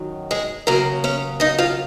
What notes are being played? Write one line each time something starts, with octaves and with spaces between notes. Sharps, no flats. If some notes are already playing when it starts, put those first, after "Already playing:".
Already playing: F#2 D#3 F#3
G#3 G#4
D#2 C#3 F#3 A#3 A#4
C#4 C#5
D#4 D#5
F4 F5